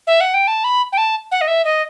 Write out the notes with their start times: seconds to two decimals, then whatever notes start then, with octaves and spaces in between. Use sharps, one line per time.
0.07 E5
0.21 F#5
0.34 G5
0.48 A5
0.64 B5
0.92 G5
0.98 A5
1.32 F#5
1.41 D#5
1.48 E5
1.65 D#5